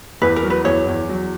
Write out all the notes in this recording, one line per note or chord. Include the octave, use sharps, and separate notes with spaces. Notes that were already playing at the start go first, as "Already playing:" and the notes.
E2 B4
A#4
F#3
B4
E2 C#5
E2
F#3